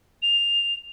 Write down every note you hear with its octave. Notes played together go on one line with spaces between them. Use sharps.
F7